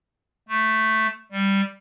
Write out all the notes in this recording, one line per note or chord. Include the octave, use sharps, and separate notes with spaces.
A3
G3